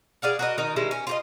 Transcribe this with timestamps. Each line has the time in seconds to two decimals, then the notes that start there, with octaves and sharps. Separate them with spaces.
0.22 G#4 D5 F5 F#5
0.39 F#4 A#4 D#5
0.58 D#3 D#4 F#4 A#4
0.76 D#3 G3 G#3 E4
0.91 C#4
1.07 F4 G4 D#5